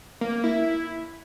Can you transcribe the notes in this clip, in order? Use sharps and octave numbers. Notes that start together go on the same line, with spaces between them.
A#3
A#3
E4